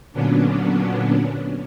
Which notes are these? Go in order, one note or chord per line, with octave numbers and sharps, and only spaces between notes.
A#2 D3 F#3 B3 C#4 D4